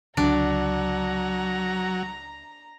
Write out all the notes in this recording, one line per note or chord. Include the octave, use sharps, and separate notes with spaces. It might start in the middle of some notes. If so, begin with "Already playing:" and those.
C#2 D3 F#3 D4 A#5